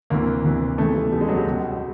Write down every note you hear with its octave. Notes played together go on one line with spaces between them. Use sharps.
D2 C3 E3 A#3
D2 C3 E3
E2 C#3 E3 A3
G3
E2 C#3 E3 G3
G#3
F#3
G3
C#2 B2 F#3